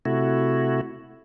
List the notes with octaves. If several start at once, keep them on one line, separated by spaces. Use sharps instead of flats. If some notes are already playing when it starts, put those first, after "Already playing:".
C3 A3 E4 F#4